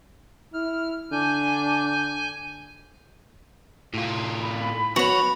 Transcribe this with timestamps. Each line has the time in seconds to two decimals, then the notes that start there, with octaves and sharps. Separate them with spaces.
0.54 E4 F6
1.12 D3 D4 G#5 G6
3.94 A2 F4
4.42 B5
4.96 B3 F#4 C#5 B5 F7